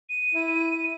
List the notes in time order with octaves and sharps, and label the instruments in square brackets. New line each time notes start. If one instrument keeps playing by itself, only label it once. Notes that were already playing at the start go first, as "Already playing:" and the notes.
[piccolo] D#7
[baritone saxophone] E4